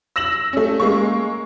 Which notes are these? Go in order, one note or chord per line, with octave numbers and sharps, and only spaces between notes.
E6 A#6 E7 F#7
A3 C#4
G#3 A#3 C#6